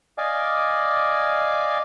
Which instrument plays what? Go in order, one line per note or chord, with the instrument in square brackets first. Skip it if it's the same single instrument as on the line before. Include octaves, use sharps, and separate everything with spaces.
[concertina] D5 D#5 F5 G#5 D6